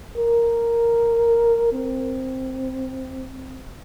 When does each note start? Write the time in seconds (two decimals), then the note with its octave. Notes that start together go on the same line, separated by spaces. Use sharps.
0.17 A#4
1.72 C4